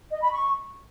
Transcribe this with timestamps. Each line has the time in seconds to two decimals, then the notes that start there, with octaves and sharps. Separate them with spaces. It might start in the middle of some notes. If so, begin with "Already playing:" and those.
0.11 D#5
0.21 B5
0.32 C#6